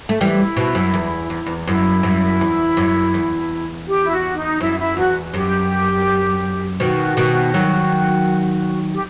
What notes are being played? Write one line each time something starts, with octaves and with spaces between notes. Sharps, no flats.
A3
E3 G3 E4
B2
F#2
E2
E2
E2
F#2 E4
F#2
E2
F#2
E2
G4
E4
F#4
D#4
F#2 E4
E4
E2 F#4
F#2 G4
B2 D#3 F#4
B2 D#3
D#3 F#3
G4